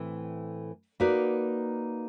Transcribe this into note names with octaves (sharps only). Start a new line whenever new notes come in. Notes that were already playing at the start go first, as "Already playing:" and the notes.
Already playing: A2 E3 A3 C4
A#3 D#4 F#4 B4 D5